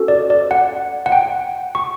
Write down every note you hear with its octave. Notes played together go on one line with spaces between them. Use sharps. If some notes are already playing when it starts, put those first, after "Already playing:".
Already playing: C#4 F#4 A4
D5
D5
F#5
F#5
G5
C#6